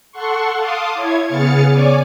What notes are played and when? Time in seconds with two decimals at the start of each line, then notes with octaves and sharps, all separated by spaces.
0.12 A4 F#5 C6 C#6
0.56 F5 A5 C6 D6 D#6
0.95 E4 C#5 G#6
1.26 C#3 B3 G#4 F6 A6 C#7
1.68 C#5 D5 G#5 D6